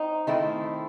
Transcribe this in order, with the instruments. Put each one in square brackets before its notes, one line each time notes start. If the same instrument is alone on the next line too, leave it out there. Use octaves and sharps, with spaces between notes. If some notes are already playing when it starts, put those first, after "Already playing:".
Already playing: [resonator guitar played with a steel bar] C4 D#4
D#3 A3 C4 E4